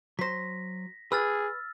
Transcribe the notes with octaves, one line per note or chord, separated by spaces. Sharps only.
F#3 C5 A#6 B6
G#4 B4 E6 F6 A6